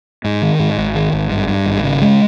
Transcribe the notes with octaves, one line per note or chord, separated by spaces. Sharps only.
G#2
D#3
G#2
G#1
D#3
G#1
G2
G2
G#1
C#3
G#3